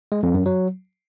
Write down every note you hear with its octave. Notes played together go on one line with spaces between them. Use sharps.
G#3
F2
F#2
F#3